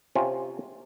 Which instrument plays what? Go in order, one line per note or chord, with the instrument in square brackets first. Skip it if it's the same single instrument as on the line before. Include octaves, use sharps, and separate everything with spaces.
[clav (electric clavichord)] C3 C#4 F4